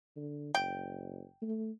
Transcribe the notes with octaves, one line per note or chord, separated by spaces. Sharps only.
D3
F#1 G5
A3